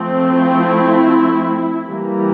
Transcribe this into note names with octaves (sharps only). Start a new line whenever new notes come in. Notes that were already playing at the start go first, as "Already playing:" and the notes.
Already playing: F3 A3 C4
E4
E3 G3 A#3